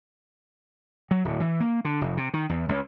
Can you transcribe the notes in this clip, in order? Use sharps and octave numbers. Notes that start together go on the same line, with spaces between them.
F#3
D1
E3
A#3
D3
F1
C3
D#3
E2
C#2